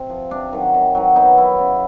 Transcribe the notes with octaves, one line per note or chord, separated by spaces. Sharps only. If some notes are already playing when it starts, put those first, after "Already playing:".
Already playing: C3 C4
F3
C3 D4
D#3 F#3
C3
D#3 F#3
B2 D#4
F#3 E4
C#3